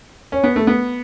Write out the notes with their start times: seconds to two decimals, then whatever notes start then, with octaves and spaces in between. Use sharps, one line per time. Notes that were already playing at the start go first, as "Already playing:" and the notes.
0.32 C#4
0.44 B3
0.56 A3
0.67 B3